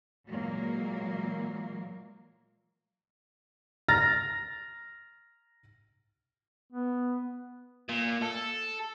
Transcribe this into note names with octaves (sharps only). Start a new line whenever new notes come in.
A#2 E3 F#3 G#3 A#3
A#5 F6 A6 A#6
B3
A#2
A4